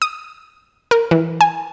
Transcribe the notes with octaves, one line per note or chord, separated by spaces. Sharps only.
D#6
A#4
E3
G#5